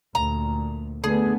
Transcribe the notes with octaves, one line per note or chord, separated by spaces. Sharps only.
D2 A#2 A#5
D3 A3 B3 G#4